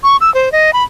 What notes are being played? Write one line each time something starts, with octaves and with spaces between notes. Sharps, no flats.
C#6
E6
C5
D#5
B5